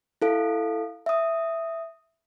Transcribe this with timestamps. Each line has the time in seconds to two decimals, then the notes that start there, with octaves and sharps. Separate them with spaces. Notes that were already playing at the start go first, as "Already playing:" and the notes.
0.22 E4 A4 F5
1.06 E5 D#6